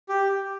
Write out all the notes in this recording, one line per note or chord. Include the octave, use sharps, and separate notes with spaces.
G4